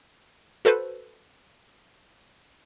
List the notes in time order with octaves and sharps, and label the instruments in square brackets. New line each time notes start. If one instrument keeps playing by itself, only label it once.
[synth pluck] F#4 A4 B4 C5